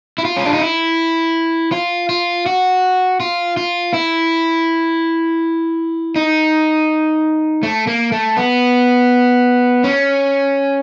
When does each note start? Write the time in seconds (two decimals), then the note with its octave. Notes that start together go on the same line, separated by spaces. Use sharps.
0.18 E4
0.25 F4
0.37 C#4
0.45 D4
0.53 D#4
0.62 E4
1.72 F4
2.09 F4
2.46 F#4
3.20 F4
3.57 F4
3.94 E4
6.16 D#4
7.63 A3
7.87 A#3
8.12 A3
8.37 B3
9.84 C#4